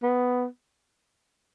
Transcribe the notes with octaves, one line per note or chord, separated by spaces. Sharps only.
B3